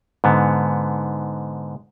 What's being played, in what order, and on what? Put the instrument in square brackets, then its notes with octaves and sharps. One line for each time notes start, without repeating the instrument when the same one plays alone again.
[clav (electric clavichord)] G#2 D3 B3